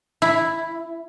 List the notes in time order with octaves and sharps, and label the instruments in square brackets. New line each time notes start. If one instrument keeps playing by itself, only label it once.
[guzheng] E4